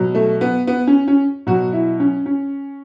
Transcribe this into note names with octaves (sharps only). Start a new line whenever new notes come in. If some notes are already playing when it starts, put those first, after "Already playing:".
Already playing: B2 F#3
A3
B3
B3
C#4
C#4
B2 F#3 F#4
E4
C#4
C#4